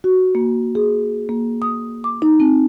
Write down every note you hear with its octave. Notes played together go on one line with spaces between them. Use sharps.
F#4
A#3
G#4
A#3
D#6
D6
D#4
C4